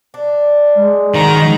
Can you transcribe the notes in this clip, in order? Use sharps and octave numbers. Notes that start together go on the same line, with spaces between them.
D4
G#3
D#3 F#3 C4 F#4 A#5